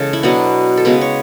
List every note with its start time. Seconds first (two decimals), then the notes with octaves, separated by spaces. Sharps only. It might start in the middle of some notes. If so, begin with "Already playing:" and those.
Already playing: C#3 E3 G#3 A4
0.13 E4
0.23 B2 F#3 B3 D4
0.77 A4
0.85 C#3 G#3 B3 B4
1.01 C#5